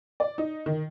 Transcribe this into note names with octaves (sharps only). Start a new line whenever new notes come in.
D5
D#4
D#3